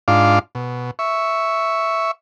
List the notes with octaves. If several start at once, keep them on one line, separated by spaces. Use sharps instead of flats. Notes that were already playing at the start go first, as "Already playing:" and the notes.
G#2 D4 F4 F5 D6
B2
E5 C#6